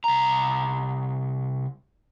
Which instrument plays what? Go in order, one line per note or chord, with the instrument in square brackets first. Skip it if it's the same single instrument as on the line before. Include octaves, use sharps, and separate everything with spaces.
[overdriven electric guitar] C2 A#5